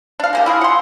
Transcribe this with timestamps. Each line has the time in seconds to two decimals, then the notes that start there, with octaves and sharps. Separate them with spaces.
0.20 D4 F5
0.33 G#3 A#3 G4
0.46 E4 F4 G#4
0.61 F#5 C6